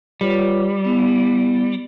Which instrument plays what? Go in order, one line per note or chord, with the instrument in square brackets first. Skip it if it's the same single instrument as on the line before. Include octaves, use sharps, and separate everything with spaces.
[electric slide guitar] G3 [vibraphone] F4 B4 C#5
[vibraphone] B3 E4